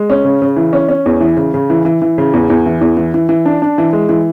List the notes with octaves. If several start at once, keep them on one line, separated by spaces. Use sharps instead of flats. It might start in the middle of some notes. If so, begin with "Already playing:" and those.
Already playing: G#3
C#4
C#3
C#3
E3
C#4
C#4
E2
E3
C#3
C#3
E3
E3
E3
C#3
E2
E2
E3
E2
E3
E3
E3
D4
D4
E3
G#3
E3